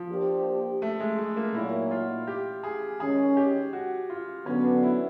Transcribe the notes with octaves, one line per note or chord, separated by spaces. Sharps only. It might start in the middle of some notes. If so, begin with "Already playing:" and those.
Already playing: F3
A#3 D4 G4 C5
A3
G#3
A3
A#3
A#2 F#3 A#3 D#4 E4 F#4
F4
G4
G#4
D#3 G#3 C#4 G#4
G4
F#4
F4
D3 F#3 B3 C#4
D4
E4